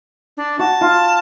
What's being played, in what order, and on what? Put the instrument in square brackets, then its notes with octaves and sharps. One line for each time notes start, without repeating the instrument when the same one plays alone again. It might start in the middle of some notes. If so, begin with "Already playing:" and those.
[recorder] D4
[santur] F#4 [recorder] A5
[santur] F4